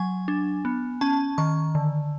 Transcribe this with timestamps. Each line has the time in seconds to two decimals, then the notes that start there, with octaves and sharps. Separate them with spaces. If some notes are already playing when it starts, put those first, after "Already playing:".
Already playing: F#3 G#5
0.28 D4
0.65 B3
1.01 C#4 A5
1.38 D#3 C#6
1.75 D3